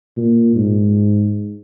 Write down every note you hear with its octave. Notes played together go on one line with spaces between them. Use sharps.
A#2
G#2